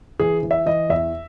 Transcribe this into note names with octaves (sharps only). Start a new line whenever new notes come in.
E3 G#4
E3
E5
E3 D#5
E2 E5